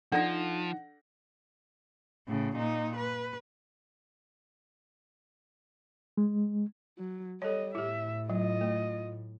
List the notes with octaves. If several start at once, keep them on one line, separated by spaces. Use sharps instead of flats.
F3 D4 D#4 A4 D5 F#5 A#6
A2 C#3
A#2 D#4
B4
G#3
F#3
G3 A4 C#5 D#5
A2 E4 G4 E5
F#3 F4 D#5
A3